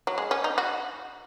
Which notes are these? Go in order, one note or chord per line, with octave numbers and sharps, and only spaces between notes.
F#3
G#3
C#4
D#4
F#4